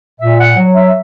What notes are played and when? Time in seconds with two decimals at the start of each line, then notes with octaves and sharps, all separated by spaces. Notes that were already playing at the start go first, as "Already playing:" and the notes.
0.20 A#2 E5
0.39 F#5
0.56 F#3
0.75 E5